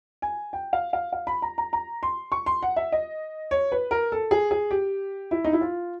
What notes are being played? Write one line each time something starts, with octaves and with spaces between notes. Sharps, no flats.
G#5
G5
F5
F5
F5
B5
A#5
A#5
A#5
C6
C#6
C6
F#5
E5
D#5
C#5
B4
A#4
A4
G#4
G#4
G4
E4
D#4
E4
F4